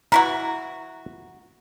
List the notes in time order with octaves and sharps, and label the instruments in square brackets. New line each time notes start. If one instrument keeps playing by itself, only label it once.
[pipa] E3 E4 F#4 [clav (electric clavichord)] A#5